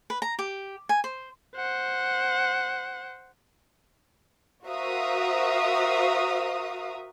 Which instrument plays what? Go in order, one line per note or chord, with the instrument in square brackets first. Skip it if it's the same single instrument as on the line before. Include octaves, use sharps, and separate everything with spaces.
[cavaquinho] B4
A#5
G4
G#5
C5
[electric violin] C5 F#5
[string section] F#4 A#4 C5 E5 F5 D#6